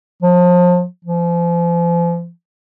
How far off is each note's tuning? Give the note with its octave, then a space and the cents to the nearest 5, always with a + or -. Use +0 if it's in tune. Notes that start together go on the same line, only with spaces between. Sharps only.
F3 +30
F3 -35